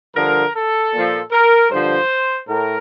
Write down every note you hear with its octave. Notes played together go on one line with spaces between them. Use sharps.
G2 D3 F3 A#4
A4
A#2 F3
A#4
G2 D3 F3 C5
A2 A#4